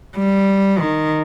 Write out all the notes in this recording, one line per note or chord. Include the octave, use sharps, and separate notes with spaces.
G3
D#3